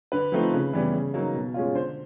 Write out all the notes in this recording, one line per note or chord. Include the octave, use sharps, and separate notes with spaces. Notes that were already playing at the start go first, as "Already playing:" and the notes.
D3 B4
F3 A3 C4 D#4
C#3
E3 G3 B3
C#3
F#3 A#3 D#4
B2
G#3 C#4 F4
D3 C5